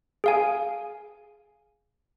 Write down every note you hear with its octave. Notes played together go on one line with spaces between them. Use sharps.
G#4 F5 G#5